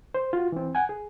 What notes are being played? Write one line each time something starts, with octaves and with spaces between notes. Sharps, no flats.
C5
F4 F#4
E3 C4
F#5 G#5
G#4